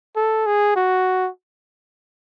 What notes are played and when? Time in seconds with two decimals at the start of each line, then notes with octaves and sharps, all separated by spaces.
0.16 A4
0.46 G#4
0.76 F#4